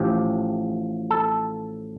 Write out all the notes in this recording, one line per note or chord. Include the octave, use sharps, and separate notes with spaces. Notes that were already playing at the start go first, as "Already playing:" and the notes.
Already playing: A1 A2 F3 G4
A4